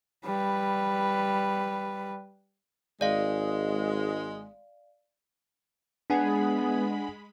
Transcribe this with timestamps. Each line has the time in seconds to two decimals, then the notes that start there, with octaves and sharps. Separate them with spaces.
0.25 G3 B4
3.01 G#1 G#3 D5 F5
6.10 G#3 B3 D4 G#4 F#5 G#5 B5